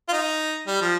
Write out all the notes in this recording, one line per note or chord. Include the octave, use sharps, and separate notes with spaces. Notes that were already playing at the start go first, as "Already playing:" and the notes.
F4
D#4
G3
F3